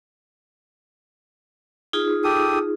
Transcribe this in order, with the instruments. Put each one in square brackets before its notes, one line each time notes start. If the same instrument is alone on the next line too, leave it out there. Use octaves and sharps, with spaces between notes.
[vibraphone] D#4 F4 G#4
[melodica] G4 A4 D#6